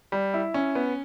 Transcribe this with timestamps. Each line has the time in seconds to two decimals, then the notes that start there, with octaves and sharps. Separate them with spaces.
0.12 G3
0.34 E4
0.54 C#4
0.75 B3